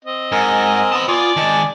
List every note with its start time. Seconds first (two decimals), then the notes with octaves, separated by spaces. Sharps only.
0.05 C4 D#5
0.32 G#2 A#4 G#5
0.92 B3 A5 C6 D#6
1.09 F4 D5 G#5
1.36 D#3 G#3 A5